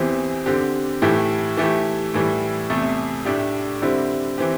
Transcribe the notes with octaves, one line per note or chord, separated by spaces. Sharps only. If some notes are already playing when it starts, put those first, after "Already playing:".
Already playing: E2 E3 C4 G4
D3 C4 G4
A2 E3 A3 E4 G4
E3 A3 E4 G4
A2 E3 G3
E2 C3 A3
A2 A3 D4 G4
D3 G3 C4 E4 G4
E3 C4 G4